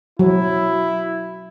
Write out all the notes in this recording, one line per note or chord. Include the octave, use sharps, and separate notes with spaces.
F#3 E4